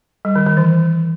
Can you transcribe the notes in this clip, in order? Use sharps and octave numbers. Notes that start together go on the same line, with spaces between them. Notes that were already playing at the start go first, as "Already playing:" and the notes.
G3
D#3
D#3
E3